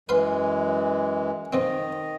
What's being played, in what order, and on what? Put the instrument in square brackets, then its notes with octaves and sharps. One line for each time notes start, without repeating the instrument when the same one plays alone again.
[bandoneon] F#2 E3 G#3 [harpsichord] B4 F5 C6
[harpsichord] F2 A#2 C4 [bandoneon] D#3 D#5